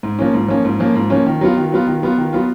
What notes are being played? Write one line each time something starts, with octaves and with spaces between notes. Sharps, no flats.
G#2
F3 A#3 C#4
G#2
F3 A#3 C#4
G#2
F3 A#3 C#4
G#2
F3 A#3 C#4
D#3
F#3 B3 F4
D#3
F#3 B3 F4
D#3
F#3 B3 F4
D#3
F#3 B3 F4